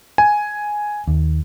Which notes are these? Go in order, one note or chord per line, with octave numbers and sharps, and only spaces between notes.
G#5
D#2